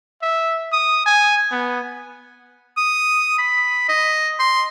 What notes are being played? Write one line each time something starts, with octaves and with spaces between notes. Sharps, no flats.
E5
D#6
G#5
B3
D#6
B5
D#5
C6